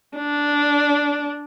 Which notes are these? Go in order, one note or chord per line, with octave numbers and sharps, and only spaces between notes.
D4